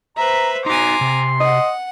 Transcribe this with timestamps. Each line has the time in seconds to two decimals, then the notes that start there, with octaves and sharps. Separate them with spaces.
0.18 B4 C5 E5 A#5
0.66 D#4 F#4 G#5 A#5 C6 D6
1.01 C3
1.40 D#5 F#5